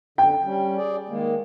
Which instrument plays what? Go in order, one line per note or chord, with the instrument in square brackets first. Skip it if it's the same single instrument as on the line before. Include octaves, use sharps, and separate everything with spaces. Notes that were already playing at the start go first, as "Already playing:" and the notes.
[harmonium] D3 [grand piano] G5
[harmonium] G3 C#4
G#4 D5
D#3 G#3 A#3